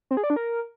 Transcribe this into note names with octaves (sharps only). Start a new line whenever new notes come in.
C4
G#4
D5
D4
A#4